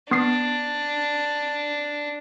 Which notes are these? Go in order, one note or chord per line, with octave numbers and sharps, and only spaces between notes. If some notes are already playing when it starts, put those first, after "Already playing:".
B3 D4 D#6 C7